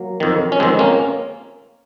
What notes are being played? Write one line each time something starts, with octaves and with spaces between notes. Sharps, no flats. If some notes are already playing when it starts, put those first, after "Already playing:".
Already playing: F#3 A#3
F2 D#3
C#4
F2 D#3 G#3 C4
A#3 C#4